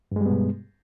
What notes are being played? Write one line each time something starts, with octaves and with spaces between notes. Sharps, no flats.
G2 B2 G3 G#3 B3